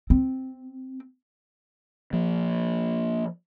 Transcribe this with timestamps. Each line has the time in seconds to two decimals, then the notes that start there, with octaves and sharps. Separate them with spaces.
0.10 C4
2.13 F3 A#3